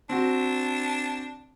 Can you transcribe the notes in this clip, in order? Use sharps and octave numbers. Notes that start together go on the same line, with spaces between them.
C4 D4 F#4